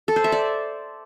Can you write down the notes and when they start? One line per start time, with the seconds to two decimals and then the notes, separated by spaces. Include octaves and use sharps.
0.08 A4
0.16 C5
0.24 E5
0.32 D5